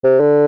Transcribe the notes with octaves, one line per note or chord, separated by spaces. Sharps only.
C3
D3